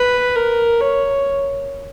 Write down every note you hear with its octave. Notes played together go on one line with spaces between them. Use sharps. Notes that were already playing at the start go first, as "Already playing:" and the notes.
Already playing: B4
A#4
C#5